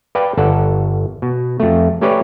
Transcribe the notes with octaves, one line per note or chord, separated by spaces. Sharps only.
B4 D5 F5 G5 A5
G1 A4 D5 F#5
B2
F2 A3
A3 C#4 G4 B4 C#5 D5